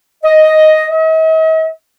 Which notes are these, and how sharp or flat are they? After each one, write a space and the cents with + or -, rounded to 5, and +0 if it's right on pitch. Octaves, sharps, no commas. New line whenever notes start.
D#5 +5
D#5 +45